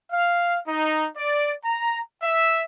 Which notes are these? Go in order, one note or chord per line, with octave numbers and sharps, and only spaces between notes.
F5
D#4
D5
A#5
E5